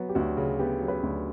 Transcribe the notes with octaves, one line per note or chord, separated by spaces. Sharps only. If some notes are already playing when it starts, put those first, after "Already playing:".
Already playing: F#3 B3 F#4
G4
D2 F#4
C#3
B3 G4
F#3
B4
D2